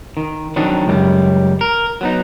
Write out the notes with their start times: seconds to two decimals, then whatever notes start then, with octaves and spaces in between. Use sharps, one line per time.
0.17 D#3
0.56 F2 D#3 F#3 D4 D#4
0.87 C#2 F#2 G3
1.61 A#4
2.01 F#3 B3 D#4